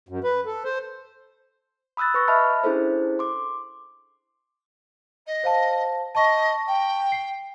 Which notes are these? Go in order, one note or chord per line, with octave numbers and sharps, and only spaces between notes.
F#2
B4
A4
C5
B5 D#6 E6 F#6 A6
B4 C#6 A#6
D#5 E5 A5 B5 F6
C#4 D4 E4 G#4 A4 C5
C6 D6
D#5
C5 F5 A5
D#5 A5 C#6
G5
C7